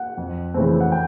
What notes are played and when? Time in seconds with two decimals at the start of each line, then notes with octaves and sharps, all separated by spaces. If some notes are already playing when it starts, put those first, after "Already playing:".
Already playing: F#5
0.17 F2
0.54 C#3 E3 A3 C4
0.80 F#5
0.92 G5